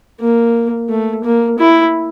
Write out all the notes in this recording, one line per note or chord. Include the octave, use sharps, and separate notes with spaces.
A#3
A3
A#3
E4